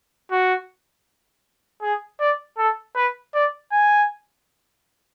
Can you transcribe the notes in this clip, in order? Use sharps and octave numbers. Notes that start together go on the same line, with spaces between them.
F#4
G#4
D5
A4
B4
D5
G#5